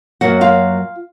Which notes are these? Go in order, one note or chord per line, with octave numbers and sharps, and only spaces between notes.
F#2 D#3 F#3 A#3 F#4 F#5
F4 F5